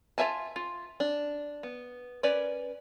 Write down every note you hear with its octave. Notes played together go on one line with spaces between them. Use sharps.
F4 B4 E5 G#5 A5
F4
D4
B3
C#4 A#4 B4 D5